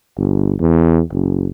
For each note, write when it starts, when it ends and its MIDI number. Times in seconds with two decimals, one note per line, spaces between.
0.17 0.53 31
0.60 1.01 40
1.12 1.48 30